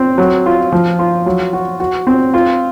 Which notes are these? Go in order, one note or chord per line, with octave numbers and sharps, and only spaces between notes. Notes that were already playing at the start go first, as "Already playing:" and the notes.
Already playing: C4
F#3
F4
F3
F4
F#3
F#4
F#4
C4
F4